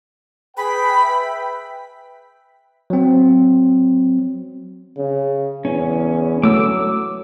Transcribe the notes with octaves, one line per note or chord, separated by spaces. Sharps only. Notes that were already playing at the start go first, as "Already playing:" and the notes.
G#4 B4 G5 B5
B4 E5 G5
F#3 C4
C#3
E2 C#4
F#3 A3 D6 E6